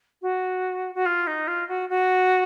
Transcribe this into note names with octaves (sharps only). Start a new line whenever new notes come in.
F#4
F#4
F4
D#4
F4
F#4
F#4